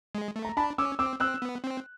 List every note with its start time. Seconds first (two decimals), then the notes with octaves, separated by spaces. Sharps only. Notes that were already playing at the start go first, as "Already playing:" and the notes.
0.15 G#3
0.36 A3
0.45 A#5
0.57 D4 A5 B5
0.78 C#4 D6 E6
0.99 C4 D6 E6
1.20 C4 E6 F#6
1.42 B3
1.64 C4